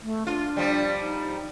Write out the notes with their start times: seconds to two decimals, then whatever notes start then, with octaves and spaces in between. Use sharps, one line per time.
0.02 A3
0.27 D4 F4
0.57 F3 G3
1.00 D#4